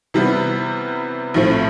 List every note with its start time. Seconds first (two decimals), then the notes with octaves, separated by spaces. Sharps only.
0.14 C3 E3 G3 B3
1.34 A#1 A2 F3 A3 C4